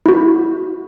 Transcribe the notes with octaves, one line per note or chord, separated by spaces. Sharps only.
E4 F#4